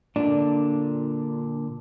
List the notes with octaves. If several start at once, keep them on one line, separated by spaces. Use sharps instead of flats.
A#2 D3 D4